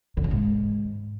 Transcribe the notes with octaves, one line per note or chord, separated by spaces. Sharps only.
D3
C#3
G#2